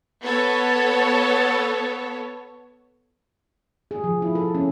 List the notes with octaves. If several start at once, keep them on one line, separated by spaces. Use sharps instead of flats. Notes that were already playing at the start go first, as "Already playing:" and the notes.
B3 A4 C#5
G#4
F3
E4
A4
C#4